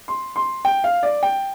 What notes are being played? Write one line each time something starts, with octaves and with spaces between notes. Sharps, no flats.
C6
C6
G5
F5
D5
G5